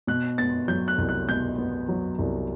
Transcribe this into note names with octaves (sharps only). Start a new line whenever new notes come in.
B2 F#6
B3 A6
F#3 G6
F#6
C2
F#6
B2 G6
B3
F#3
C2